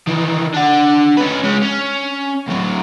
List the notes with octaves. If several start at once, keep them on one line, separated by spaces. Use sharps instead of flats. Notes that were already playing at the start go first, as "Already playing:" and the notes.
D#3 E3
D4 F#5
C#4 B4
G#3 C#4
C#4
D2 F#3